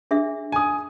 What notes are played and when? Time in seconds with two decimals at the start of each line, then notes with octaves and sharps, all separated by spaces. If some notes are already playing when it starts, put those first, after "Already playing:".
0.11 D4 G#4 E5
0.52 G#5 D#6